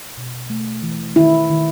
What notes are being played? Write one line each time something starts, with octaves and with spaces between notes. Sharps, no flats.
B2
A3
E3
D#3 E4
D#3